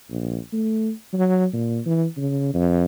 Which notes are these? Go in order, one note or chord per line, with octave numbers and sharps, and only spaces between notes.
A#1
A3
F#3
A#2
E3
C#3
F2